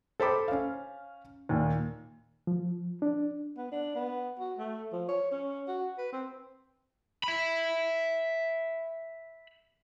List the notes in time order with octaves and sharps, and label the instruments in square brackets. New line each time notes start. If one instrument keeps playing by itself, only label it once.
[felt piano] A4 C5 G5 B5 D6
C#4 F5
D#2 A#2
[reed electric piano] F3
D4
[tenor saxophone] B3
D4
B3
F#4
A3
F3
C#5
C#4
F#4
B4
C4
[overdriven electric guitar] E5 B5